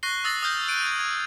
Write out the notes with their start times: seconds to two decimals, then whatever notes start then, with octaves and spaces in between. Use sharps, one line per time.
0.03 C#6 F#6 A#6 C7 G7
0.24 D#6 E6 A6 A#6 F#7
0.43 D#6 F6 G6 A#6
0.68 F#6 D7 D#7
0.86 G#6
1.00 G#6